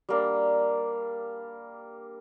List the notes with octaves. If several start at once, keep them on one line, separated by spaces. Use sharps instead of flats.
G3 A#3 D4